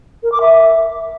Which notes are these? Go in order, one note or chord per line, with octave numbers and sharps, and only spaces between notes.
A#4
D6
E5